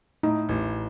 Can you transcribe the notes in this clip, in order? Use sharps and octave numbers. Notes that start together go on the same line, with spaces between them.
A2 D#4
A1